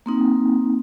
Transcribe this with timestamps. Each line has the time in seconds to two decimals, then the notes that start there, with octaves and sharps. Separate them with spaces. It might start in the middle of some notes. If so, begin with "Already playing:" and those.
0.06 A#3 C4 D#4